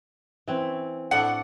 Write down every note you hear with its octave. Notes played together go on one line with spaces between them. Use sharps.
E3 C4 C#4
A2 D4 A4 F#5